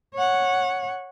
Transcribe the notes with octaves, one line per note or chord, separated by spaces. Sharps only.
C#5 F#5